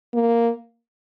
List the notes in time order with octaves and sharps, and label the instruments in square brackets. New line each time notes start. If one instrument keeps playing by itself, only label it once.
[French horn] A#3